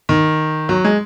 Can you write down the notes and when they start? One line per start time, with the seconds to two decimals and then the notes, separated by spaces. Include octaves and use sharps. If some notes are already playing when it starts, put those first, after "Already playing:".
0.09 D#3
0.69 F#3
0.84 G#3